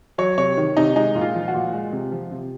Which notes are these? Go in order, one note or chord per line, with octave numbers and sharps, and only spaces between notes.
F#3 C#5
C3 C#5
D#3
C3 D#4
G#3 D#4
A#2
F4
F3
F#4
A#2
G#3
C3
F3
C3